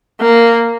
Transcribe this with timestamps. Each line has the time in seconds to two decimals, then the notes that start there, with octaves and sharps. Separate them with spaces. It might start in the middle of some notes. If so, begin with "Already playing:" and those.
0.21 A#3